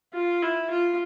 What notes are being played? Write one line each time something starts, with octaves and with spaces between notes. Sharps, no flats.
F4
E4
F4